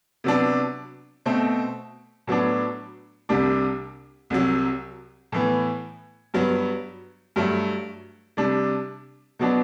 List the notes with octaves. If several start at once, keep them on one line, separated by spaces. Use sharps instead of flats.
C3 F#3 B3 D4
B2 A3 C4
A2 F#3 B3 D4
C2 C3 G3 D4
C2 C3 F#3
A2 E3 B3
G2 F#3 B3
G2 F#3 A3
C3 G3 D4
B2 F#3 B3 D4